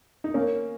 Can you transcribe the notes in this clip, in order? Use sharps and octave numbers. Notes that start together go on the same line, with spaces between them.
D#4
A#3 C#4